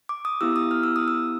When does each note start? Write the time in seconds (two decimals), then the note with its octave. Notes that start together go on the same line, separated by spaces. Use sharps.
0.09 D6
0.25 D#6
0.41 B3 E4 G4 E6
0.56 D#6
0.71 F6
0.83 E6
0.96 D#6
1.08 E6